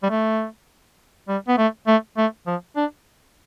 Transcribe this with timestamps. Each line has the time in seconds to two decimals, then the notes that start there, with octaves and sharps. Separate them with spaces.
0.03 G3
0.10 A3
1.28 G3
1.48 B3
1.58 A3
1.87 A3
2.17 A3
2.47 F3
2.76 D4